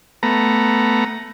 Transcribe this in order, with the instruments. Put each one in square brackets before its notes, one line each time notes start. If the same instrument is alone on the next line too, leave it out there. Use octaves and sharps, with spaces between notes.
[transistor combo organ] A3 B3 A#5